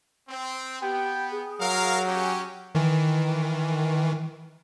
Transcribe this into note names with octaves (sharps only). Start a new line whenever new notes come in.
C4
B3 G4 G5
G#4
F#3 A#4 F5
C#4 G4
D#3 E3